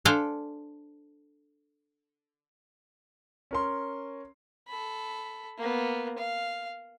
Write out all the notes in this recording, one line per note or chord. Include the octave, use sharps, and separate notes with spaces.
D4 A4 C5 D5 F5 G#5
C#4 A#4 C6
A4 B5
A#3 B3
F5